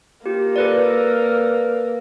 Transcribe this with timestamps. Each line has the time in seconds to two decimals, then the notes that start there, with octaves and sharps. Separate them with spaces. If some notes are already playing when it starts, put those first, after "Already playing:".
0.26 A#3 F4 G4
0.56 A4 B4 D5